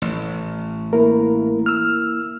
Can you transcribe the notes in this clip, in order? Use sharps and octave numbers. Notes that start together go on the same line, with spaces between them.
A1
A#3 E4 A#4
E6 F6